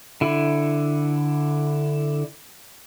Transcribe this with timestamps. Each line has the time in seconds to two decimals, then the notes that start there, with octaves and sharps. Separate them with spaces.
0.21 D3 E4